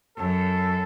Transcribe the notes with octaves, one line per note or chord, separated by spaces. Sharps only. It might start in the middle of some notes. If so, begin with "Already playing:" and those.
F#2 A4